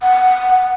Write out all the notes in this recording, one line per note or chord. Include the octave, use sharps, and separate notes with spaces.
F#5